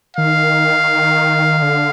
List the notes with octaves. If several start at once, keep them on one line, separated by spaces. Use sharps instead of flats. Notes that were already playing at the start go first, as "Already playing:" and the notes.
D#3 F5
D3